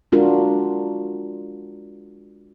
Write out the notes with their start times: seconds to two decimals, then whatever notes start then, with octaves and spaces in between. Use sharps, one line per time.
0.12 G#3 D4 F4 F#4 A#4